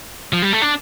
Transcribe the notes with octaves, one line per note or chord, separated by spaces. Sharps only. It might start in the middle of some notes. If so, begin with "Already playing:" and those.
F3
G3
A3
D4